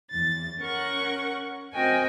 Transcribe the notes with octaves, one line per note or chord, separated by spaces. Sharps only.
E2 A6
C#4 A#4 F#5 C#6
C4 F#4 A#4 D#5 G5 G#5